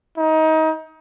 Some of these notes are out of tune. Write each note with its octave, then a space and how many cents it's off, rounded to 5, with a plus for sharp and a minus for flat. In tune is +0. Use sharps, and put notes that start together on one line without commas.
D#4 +25